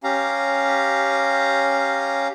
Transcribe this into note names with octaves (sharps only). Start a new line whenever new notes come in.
C#4 G4 F5 A#5